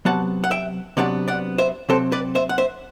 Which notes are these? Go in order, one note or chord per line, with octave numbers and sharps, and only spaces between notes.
C3 F#3 B3 F#5 A5
F#5
E5 G5
C3 F#3 B3 D4 D5 F#5
D5 F#5
C5 E5
C3 F#3 C4 A4 C5
B4 D5
C5 E5
F#5
C5 E5